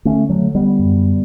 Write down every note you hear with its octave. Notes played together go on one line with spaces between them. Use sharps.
D3 A3 C#4
F#3 A3
D3
G3 B3
F#2